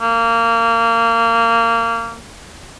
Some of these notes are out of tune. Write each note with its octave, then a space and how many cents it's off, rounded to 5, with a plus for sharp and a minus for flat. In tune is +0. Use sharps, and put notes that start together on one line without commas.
A#3 -20